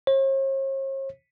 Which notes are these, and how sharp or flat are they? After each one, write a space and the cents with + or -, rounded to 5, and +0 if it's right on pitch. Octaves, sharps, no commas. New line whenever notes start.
C#5 -45